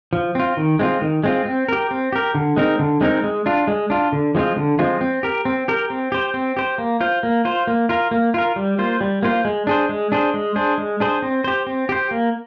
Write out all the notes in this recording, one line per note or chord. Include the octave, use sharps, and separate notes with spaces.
F3
C4 F4
D#3
G#3 C4 F4
D#3
G#3 C4 F4
C4
G4 A#4
C4
G4 A#4
D3
G#3 C4 D#4 A#4
D3
G#3 C4 D#4 A#4
G#3
D4 F4
G#3
D4 F4
D3
F3 G#3 C4 F4
D3
F3 G#3 C4 F4
C4
G4 A#4
C4
G4 A#4
C4
G4 C5
C4
G4 C5
A#3
F4 C5
A#3
F4 C5
A#3
F4 A#4
A#3
F4 A#4
G3
A#3 F4 C5
G3
A#3 F4 C5
G#3
D4 G#4 C5
G#3
D4 G#4 C5
G#3
D4 G#4 C5
G#3
D4 G#4 C5
C4
G4 C5
C4
G4 C5
A#3